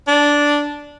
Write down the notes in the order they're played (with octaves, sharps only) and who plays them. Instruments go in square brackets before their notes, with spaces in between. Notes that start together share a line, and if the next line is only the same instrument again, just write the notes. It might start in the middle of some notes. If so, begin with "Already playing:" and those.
[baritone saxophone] D4